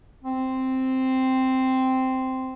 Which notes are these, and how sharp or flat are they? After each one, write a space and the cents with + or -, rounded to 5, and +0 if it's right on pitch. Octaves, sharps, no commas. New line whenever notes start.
C4 -5